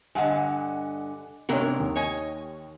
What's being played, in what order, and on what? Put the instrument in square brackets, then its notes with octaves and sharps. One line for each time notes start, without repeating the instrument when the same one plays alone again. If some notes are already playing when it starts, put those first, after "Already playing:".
[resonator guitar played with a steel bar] G2 D3 [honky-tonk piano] D#5 F#5 G#5
[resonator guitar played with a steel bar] G#2 C3 A#4 [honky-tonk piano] B3 D4 C#5
[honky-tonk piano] D#2
[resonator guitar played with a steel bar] C#5 D#5 G#5